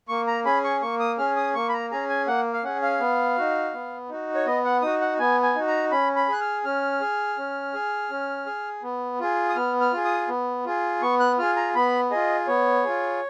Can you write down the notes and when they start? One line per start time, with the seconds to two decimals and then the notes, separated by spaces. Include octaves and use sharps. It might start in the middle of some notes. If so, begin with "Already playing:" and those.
0.09 A#3 C#6
0.27 A#5
0.45 C#4 G#4 B5
0.64 C#6
0.82 A#3 C#6
1.00 D#6
1.18 C#4 G#4 F6
1.37 D#6
1.55 A#3 C#6
1.69 B5
1.73 A#5
1.91 C#4 G#4 A#5
2.09 G#5
2.27 A#3 F#5
2.54 F5
2.63 C#4 G#4 F#5
2.82 F5
3.00 B3
3.37 D#4 F#4
3.73 B3
4.09 D#4 F#4
4.35 C#5
4.46 B3 D#5
4.65 F#5
4.82 D#4 F#4 D#6
5.01 F#5
5.19 B3 G#5
5.43 G#5
5.55 D#4 F#4
5.68 A#5
5.91 C#4 B5
6.16 B5
6.28 G#4 F#6
6.41 F6
6.65 C#4 F6
7.01 G#4
7.38 C#4
7.74 G#4
8.10 C#4
8.46 G#4
8.83 B3
9.20 F4 G#4
9.49 D#6
9.56 B3 F6
9.81 F6
9.93 F4 G#4
10.05 D#6
10.28 B3
10.65 F4 G#4
11.02 B3 C#6
11.20 F#6
11.38 F4 G#4 F6
11.56 A#5
11.75 B3 B5
12.11 F4 G#4 D#5
12.47 B3 C#5
12.85 F4 G#4